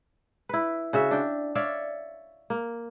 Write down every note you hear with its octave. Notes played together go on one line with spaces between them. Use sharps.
E4 B4
C#3 F#4 E5
D4 G5
C#5 D5 E5 F5
A#3